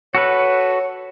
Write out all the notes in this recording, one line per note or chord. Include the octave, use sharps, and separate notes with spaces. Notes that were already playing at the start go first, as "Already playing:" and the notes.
F#4 A4 B4 C#5